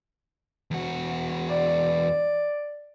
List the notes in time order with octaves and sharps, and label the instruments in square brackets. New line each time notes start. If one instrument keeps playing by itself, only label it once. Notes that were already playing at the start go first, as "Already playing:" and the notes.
[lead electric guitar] E2 F#4
[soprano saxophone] D5